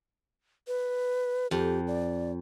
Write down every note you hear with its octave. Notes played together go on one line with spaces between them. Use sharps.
B4
F2 G4
D5